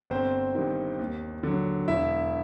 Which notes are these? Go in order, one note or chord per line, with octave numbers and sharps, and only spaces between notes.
G1 C4 C5
G2 D#3
D#2
D3 F#3
E1 E4 E5